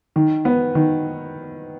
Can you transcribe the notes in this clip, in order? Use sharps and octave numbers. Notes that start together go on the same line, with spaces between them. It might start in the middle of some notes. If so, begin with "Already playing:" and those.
D#3
B3
D#3